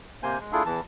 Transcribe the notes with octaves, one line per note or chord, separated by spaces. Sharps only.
C3 A#3 C5 G#5 G6
G#3
A3 D4 E4 F4 G#4 A4
E2 E3 A5